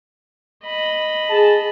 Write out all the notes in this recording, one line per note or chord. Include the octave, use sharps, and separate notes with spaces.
D#5 B5
G#4 A5